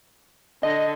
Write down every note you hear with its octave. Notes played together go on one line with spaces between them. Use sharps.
D3 D#5